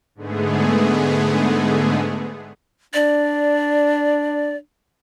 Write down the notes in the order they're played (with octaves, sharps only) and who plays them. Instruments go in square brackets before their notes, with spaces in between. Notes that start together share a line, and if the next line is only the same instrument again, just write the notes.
[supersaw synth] G#2 D3 G#3 A3 B3 G#4
[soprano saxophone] D4 [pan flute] D5